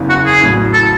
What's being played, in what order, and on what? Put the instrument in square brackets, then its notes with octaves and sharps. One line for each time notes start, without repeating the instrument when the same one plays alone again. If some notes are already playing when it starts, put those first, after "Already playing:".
Already playing: [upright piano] F#1 E2 C#3
[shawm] F#4
G#4
[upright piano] A1 A2 F#3
[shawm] A4